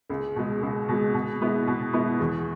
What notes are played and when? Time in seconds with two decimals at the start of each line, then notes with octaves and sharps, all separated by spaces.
0.10 C#2
0.36 B2 G#3
0.62 C#2
0.89 B2 G#3
1.14 B2
1.41 G#3 B3 E4
1.67 B2
1.93 G#3 B3 E4
2.20 E2